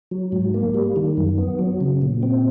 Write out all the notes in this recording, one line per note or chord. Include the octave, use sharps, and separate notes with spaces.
F#3
G#2
A#3
G3
D#3
F#2
B3
F#3
C#3
A#2
C4